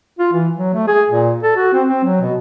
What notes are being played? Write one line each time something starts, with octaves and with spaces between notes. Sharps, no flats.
F4
E3
F#3
A3
G#4
A#2
A4
F#4
C4
C4
F#3
B2